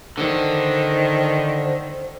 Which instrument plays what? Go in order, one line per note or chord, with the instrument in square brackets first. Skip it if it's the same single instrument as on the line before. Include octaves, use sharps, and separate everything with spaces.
[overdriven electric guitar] D3 [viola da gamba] D#3 [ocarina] C5